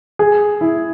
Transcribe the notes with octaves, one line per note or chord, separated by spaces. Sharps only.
G#4
E4